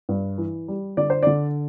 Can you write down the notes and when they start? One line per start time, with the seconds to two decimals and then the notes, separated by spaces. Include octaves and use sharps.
0.09 G2
0.38 E3
0.68 G3
0.97 D3 D5
1.10 C5
1.23 D3 D5